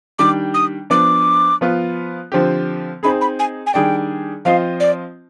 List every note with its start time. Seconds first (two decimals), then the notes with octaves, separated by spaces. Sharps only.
0.19 D#3 G3 D4 G4 D6
0.54 D#6
0.90 F3 B3 D4 D6
1.61 F3 B3 F4
2.32 D3 F3 C4 G4
3.03 C4 D#4 G#4 B5
3.21 B5
3.39 G#5
3.67 G#5
3.74 D#3 G3 D4 G#4 D5 G5
4.45 F3 C4 F4 C5 D#5 F5
4.80 D5